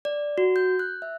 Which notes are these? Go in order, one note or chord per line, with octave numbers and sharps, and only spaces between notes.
D5
F#4
G6
F#6
E5